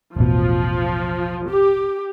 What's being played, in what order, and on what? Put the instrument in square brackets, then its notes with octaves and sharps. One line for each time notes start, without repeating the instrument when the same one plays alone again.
[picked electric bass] E1 A1 B2 [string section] F3
[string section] G4